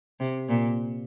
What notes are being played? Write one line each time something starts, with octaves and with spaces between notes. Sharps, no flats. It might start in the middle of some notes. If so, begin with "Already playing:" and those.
C3
A#2